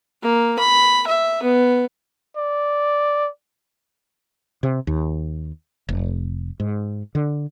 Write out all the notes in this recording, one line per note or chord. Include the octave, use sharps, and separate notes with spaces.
A#3
B5
E5
B3
D5
C3
D#2
F1
G#2
D3